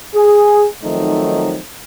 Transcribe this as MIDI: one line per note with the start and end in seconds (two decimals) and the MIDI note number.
0.15 0.66 68
0.84 1.60 51
0.84 1.60 53
0.84 1.60 54
0.84 1.60 57
0.84 1.60 60
0.84 1.60 63